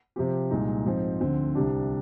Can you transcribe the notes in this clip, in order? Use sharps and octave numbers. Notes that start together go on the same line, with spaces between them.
C3 F3 C4 G4
C2 A#2 G#3 D#4
G#2 F3 C4 D#4
D2 D3 F3 C4
C2 C3 G3 D4